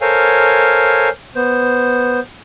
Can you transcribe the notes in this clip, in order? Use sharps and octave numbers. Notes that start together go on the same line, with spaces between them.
A4 A#4 C5 C#5 F5 G#5
B3 C5